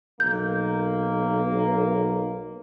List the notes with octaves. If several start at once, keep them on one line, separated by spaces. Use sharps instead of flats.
B1 A#3 G6